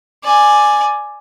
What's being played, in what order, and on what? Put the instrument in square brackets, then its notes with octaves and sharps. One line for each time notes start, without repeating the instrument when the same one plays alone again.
[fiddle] D5 G#5